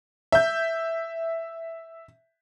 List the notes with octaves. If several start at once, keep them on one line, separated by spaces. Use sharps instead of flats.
E5 G6